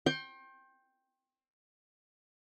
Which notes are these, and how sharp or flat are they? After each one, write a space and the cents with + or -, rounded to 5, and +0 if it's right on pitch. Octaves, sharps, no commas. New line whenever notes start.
G5 +0 C6 +40